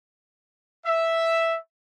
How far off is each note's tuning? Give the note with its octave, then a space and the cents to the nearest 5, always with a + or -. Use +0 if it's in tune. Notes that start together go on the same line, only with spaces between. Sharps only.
E5 +0